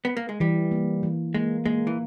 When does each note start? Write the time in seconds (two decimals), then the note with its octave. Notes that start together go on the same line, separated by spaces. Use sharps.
0.05 B3
0.17 A#3
0.29 G#3
0.40 E3 G3
0.71 A#3
1.03 E3
1.34 G#3 A#3
1.65 G#3 A#3
1.87 E3